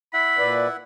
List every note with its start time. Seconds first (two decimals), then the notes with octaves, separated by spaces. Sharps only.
0.14 E4 E5 F#5 B5
0.38 A#2 B4 D5